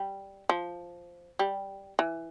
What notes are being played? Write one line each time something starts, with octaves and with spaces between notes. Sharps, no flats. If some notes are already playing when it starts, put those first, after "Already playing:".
Already playing: G3
F3
G3
E3